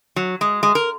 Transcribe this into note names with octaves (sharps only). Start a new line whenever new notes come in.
F#3
G#3
G#3
A#4